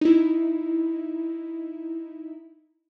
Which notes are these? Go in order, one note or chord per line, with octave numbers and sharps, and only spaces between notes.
D#4 E4